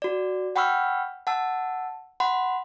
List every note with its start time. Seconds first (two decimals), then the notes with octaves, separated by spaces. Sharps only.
0.02 F#4 D5
0.56 F#5 G5 B5 C#6 E6 F6
1.27 F#5 A5 E6
2.20 F#5 B5 C6